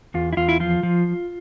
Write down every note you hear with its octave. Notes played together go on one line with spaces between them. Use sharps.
E2 F4
E4
E2 F4
E4
F3 F4
F3